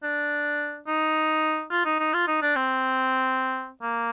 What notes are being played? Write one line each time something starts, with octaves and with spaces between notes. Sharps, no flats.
D4
D#4
F4
D#4
D#4
F4
D#4
D4
C4
A#3